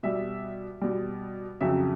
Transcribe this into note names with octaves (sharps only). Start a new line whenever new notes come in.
B2 G3 E5
B2 G3
F2 C#3 F#3 E5